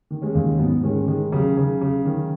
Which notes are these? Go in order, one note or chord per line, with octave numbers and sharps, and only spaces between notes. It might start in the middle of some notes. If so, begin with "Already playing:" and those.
D#3
G#3 C#4
D#2
G#2 F#3 B3
D#3 G#3 C#4
D#3 G#3
C#3 F#3
C#3
C#3
D#3